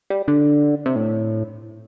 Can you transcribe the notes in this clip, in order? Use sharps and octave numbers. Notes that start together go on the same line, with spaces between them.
G3
D3
C3
A2